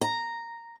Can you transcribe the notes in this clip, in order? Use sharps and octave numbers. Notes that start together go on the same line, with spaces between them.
A#5